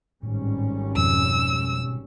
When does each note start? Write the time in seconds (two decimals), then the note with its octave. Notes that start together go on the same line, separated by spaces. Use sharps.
0.23 G#1 A2 G3 C#4
0.96 F2 B2 E6